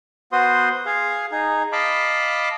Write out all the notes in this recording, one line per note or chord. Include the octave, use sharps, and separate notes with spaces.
B3 F#4 C5 C6 D#6
G#4 F5
D#4 G#4
D#5 F5 A5 B5 D6